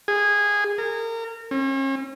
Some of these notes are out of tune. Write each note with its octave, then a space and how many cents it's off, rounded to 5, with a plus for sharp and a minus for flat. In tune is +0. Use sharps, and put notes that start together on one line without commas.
G#4 -15
A#4 -30
C#4 -40